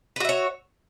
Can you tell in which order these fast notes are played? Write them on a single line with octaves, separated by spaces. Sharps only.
B4 F#4 E5 C#5